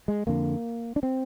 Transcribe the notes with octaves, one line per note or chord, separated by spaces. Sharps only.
G#3
F2 D3 A#3
D4
C4